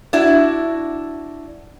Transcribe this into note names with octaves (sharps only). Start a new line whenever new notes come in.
D4 E4 F#4